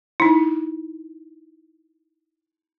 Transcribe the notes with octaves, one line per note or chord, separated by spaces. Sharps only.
D#4 E4